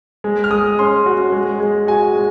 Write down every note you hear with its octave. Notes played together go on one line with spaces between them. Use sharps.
G#3
F6
G#3 D#6
C#4 C6
F#4
G#3
G#3
F#4 G#5
G#3